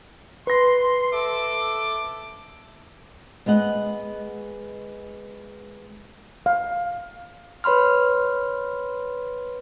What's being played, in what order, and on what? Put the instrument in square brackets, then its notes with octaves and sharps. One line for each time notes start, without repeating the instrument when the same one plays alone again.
[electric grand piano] B4 A#6 [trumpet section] C6
[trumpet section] A4 E5 D6
[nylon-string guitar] G#3 B3 D#5 F#5
[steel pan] F5
[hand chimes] B4 C#5 B5 C6 F6